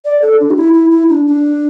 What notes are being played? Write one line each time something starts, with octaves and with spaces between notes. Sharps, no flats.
D5
A4
D4
G4
E4
E4
E4
D4
D4